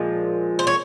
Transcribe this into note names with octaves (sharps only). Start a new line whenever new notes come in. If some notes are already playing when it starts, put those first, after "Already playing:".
Already playing: A#2 F3 G#3
C5
C#5